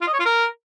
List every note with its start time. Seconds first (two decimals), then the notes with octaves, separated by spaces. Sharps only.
0.01 F4
0.07 D#5
0.13 C#5
0.19 F4
0.25 A#4